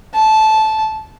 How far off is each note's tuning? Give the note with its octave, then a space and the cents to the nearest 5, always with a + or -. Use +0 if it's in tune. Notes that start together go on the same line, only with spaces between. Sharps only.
A5 -15